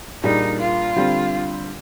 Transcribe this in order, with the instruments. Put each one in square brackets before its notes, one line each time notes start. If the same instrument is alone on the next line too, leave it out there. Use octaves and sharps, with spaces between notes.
[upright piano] A#2 G3 A#3 D4 G#4 [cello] D#4
[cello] F4
[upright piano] D3 G3 C4